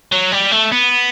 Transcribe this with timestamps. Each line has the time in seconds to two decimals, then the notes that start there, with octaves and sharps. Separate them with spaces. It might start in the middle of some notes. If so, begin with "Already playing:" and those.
0.12 F#3
0.32 G3
0.52 A3
0.72 B3